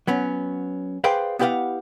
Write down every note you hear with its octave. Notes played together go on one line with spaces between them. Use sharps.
F#3 B3 C#4
G#4 B4 C5 D5 F5 G5
B3 E4 G4 B4 F5 F#5